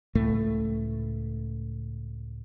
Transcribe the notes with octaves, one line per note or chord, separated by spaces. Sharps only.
C#2 A2 A3